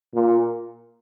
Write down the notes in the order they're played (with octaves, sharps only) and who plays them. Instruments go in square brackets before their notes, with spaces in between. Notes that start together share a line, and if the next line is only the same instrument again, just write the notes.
[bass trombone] A#2